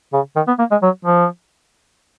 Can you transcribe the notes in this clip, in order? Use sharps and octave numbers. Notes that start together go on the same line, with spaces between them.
C#3
D#3
B3
A#3
G#3
F#3
F3